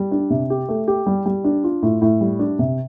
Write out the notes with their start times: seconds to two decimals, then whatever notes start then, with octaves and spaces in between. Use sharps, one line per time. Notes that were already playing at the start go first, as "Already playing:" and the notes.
Already playing: G3
0.12 D4
0.30 C3
0.50 G4
0.69 A3
0.88 G4
1.06 G3
1.26 G3
1.44 D4
1.64 F4
1.82 A2
2.01 A2
2.21 G3
2.39 D4
2.59 C3